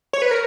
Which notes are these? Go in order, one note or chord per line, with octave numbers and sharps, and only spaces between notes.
C#5
B4
A#4